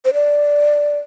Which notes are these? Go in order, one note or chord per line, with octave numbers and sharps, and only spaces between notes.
C5
D5